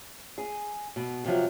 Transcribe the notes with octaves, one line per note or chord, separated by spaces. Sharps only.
G#4
B2
C3 F3 F#3